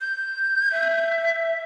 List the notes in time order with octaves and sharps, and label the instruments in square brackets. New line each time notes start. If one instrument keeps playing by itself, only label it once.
[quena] G6
[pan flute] E5